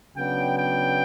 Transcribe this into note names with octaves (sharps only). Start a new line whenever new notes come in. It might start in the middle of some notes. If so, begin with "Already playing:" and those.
C#3 F#3 B3 D4 G5
G5